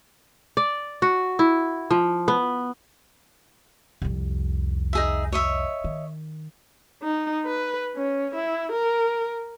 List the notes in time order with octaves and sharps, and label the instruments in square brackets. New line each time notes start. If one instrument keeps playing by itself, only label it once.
[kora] D5
F#4
E4
F3
B3
[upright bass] C2 F2
[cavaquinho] D#4 G#4 E5
C#5 D#5 E5
[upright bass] D#3
[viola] D#4
B4
C#4
E4
A#4